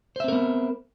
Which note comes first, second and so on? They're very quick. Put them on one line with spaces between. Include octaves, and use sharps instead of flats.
C5 E5 C4 A#4 B3